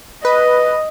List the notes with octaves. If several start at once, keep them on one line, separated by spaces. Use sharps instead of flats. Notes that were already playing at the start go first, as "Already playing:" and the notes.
B4 D#5